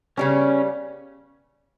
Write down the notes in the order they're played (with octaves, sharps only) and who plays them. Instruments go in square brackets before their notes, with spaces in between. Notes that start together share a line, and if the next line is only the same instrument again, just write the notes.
[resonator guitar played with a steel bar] C#3 G3 B3 [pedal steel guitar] C#4